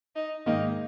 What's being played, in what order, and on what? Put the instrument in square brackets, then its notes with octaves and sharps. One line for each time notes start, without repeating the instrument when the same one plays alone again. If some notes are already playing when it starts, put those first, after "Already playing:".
[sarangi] D#4
[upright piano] G#2 D#3 A#3 [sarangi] D#4